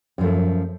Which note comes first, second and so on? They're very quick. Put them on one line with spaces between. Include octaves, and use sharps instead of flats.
F#2 F3 A3